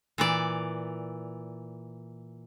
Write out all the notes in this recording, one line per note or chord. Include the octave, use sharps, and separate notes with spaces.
A#2 E3 D5